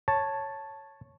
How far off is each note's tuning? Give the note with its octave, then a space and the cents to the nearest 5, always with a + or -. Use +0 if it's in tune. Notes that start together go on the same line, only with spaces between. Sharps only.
C#5 -5 A5 +0